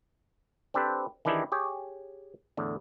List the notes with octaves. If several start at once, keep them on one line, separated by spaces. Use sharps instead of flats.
C4 D4 G4 A4 B4 C5
D#3 E3 D4 E4 G4 G#4
G4 G#4 C#5
E2 A2 D3